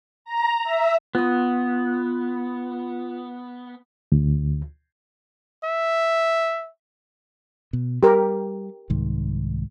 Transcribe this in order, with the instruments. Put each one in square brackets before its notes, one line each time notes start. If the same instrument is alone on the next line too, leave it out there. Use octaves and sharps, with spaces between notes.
[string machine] A#5
E5
[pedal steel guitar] B3 [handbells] F4 D#6
[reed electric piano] D2
[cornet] E5
[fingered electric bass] B2
[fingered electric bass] G3 [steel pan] G4 A#4
[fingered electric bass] C2 G#2 D#3